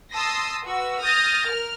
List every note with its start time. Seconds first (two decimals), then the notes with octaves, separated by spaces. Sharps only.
0.12 A5 C6 D#6 E6 A#6
0.66 F#4 B4 E6
1.02 D#6 F6 G6 A6 A#6
1.45 A#4 F6